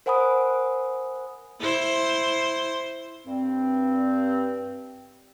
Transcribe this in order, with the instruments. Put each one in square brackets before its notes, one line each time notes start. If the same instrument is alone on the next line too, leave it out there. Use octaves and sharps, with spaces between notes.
[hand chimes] A#4 C5 F#5 G#5 B5 D#6
[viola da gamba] E4 C5
[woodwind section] G2 C4